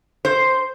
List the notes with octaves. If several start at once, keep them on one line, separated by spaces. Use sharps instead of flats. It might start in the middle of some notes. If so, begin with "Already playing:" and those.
C5